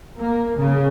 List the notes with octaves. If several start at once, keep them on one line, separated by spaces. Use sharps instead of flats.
A#3
C#3